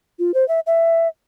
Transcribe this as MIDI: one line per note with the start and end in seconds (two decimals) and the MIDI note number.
0.19 0.34 65
0.34 0.47 72
0.48 0.60 76
0.66 1.08 76